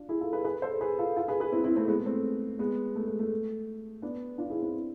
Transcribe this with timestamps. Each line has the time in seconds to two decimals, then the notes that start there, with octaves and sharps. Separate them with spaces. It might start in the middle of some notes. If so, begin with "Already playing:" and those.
Already playing: D4 F4
0.09 E4 G#4
0.21 F4 A4
0.33 G#4 B4
0.44 G#4 B4
0.62 A4 C5
0.81 G#4 B4
0.99 F4 A4
1.16 F4 A4
1.28 G#4 B4
1.40 G#4 B4
1.52 C4 E4
1.64 C4 E4
1.76 A3 C4
1.88 G#3 B3
2.05 A3 C4
2.59 G#3 B3
2.95 A3
3.07 G#3
3.19 A3
4.02 B3 D4
4.38 D4 F4
4.50 E4 G#4
4.62 C4 E4